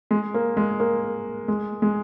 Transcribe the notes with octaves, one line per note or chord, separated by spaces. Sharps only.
G#3
A#3
G#3
A#3
G#3
G#3